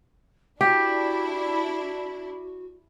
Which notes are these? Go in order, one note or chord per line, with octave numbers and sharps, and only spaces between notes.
D4 E4 F#4 G4